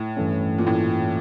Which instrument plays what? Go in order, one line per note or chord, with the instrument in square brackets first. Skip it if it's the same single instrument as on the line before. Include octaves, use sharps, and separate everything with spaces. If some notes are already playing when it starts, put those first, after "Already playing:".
Already playing: [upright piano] A2
[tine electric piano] G2 E3 A3 C#4
[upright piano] A#2
A2